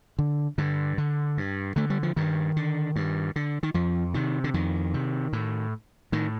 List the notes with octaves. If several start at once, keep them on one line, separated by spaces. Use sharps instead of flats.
D3
G2 D3
D3
G2
D3 A3
G3
F3
G2 D#3
D3
G2
D3
D#3
F2 F3
C3 D#3
D3
F2 D#3
C3
A2
A2 D#3